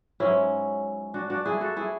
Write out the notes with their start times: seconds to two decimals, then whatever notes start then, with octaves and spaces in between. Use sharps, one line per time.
0.20 G#2 F#3 C#4 E4
1.14 D4 F#4
1.30 D4 F#4
1.45 E4 G#4
1.61 F#4 A4
1.76 E4 G#4